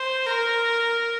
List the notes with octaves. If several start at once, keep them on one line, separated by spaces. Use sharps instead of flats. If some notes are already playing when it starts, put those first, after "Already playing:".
Already playing: C5
A#4